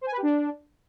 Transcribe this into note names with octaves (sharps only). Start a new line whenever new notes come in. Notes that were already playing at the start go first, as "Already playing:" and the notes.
C5
G#5
B4
G4
D4